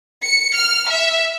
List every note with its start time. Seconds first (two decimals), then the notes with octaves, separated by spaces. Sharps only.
0.24 C#7
0.55 F6
0.89 E5